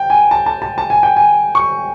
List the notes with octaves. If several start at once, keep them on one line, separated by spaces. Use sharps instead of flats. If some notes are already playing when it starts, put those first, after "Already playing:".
Already playing: G5
G#5
A5
A5
A5
A5
G#5
G5
G#5
C#6